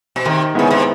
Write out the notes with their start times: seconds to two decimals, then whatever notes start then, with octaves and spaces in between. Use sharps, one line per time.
0.16 B2
0.25 C3 D#3
0.54 C#3 G#3 B3 E4
0.71 C3